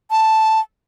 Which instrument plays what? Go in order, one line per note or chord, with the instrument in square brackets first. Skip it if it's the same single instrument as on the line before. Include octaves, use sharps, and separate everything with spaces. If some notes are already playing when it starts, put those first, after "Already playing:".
[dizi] A5